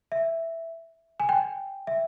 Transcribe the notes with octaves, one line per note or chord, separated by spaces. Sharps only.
E5
G#5
G5
E5